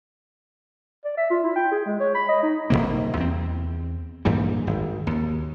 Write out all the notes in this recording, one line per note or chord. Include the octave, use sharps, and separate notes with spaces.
D5
E5
F4
E4
G5
G#4
G#3
C#5
B5
D#5
D#4
D#1 E2 C3 A#3
E2 C4
G2 A#2 E3 G3
G#1
D#2